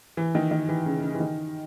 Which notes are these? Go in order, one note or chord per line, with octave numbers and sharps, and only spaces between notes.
E3
D#3
D#3
E3
C#3
C#3
E3
D#3